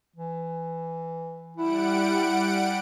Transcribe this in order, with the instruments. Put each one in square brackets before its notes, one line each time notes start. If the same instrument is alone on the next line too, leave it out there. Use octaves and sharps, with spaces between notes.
[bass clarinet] E3
[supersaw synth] G3 F#5 D7 [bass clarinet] E4